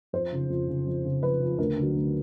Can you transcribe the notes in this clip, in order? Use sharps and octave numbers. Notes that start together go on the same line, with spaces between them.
F2 C5
C#3 F3
F2
C#3 F3
F2
C#3 F3
F2 B4
C#3 F3
D2 A#4
D3 F#3
D2